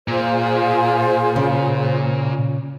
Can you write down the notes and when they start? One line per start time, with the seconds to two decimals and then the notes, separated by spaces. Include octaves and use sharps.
0.08 A#2 F4 G#4 C5
1.36 C#3